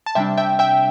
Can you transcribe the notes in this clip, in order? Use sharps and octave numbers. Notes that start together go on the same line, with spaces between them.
A5
C3 G3 D4 E5 G5
E5 G5
E5 G5